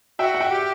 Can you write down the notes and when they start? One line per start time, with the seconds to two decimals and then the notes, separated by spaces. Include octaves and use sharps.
0.19 F#4 E5 G5
0.34 F#5
0.40 E5 G5
0.51 G4